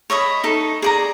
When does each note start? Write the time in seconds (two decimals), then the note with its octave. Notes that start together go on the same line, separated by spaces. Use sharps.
0.10 C#5 D#5 E5 B5
0.44 D#4 A4
0.82 G#4 D5 A#5